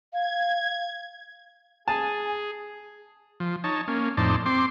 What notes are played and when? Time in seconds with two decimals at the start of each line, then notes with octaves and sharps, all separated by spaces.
0.13 F5 G#6
1.88 G#4 G#5 A5
3.40 F3
3.64 D#4 C#5 A5
3.88 A#3 C#4
4.17 F2 A2 D#4 C5 D5 A5
4.46 C4 C6 D6